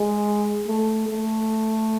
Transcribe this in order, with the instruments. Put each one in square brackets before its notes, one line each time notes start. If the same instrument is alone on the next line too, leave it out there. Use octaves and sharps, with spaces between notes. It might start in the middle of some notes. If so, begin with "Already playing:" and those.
Already playing: [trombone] G#3
A3
A3